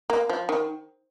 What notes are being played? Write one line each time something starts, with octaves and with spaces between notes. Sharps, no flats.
A#3
F3
D#3